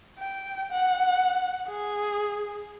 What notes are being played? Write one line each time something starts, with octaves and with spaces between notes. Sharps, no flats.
G5
F#5
G#4